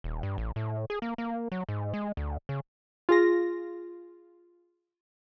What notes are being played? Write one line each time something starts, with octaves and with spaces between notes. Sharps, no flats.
D#1
G2
A1
A2
G#4
A#3
A#3
F#3
G#2
G#3
D2
C#3
F4 G#4 A#6